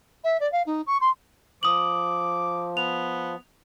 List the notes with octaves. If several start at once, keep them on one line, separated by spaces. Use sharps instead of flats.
E5
D5
F5
D#4
C#6
C6
F3 D6 D#6 F#7
B3 F7